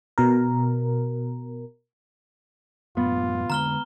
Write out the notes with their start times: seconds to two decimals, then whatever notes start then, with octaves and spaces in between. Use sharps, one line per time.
0.18 B2 A#4
2.97 F#2 A2 B3 F4
3.50 D3 G#3 A#5 F6 G7